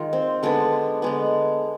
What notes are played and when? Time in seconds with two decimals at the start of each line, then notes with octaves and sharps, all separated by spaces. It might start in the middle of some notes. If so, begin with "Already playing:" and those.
Already playing: D#3 G#3 F4
0.13 C4
0.43 D3 G#3 B3 D4
1.02 D3 G#3 B3